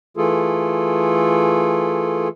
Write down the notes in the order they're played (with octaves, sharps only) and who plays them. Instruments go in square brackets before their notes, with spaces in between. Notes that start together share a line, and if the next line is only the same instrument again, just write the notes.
[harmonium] E3 A3 F4 G#4 A4